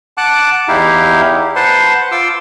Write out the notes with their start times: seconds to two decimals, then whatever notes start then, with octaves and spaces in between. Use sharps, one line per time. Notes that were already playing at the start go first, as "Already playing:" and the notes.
0.18 F#5 A5 D6 F#6
0.68 E2 D#4 E4 G4 F5
1.56 B4 C5 F#5 A5 C6
2.12 F4 C6 D6 E6